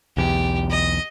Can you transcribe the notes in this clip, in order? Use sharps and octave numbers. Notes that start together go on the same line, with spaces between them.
B1 E2 G4
D#5